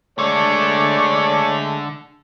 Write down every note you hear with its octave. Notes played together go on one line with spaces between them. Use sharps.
D3 G#3 A3 D4 C#5 D5